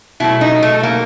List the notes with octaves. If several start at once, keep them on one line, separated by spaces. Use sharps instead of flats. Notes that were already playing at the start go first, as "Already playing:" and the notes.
B2 F#3 A3 E4
D#4
A3
A#3